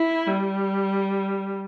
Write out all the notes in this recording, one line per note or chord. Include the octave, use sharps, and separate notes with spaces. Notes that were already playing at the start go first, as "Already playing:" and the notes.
Already playing: E4
G3